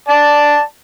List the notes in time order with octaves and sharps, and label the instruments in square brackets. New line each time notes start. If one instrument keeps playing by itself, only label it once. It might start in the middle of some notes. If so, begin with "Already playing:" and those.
[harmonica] D5 A5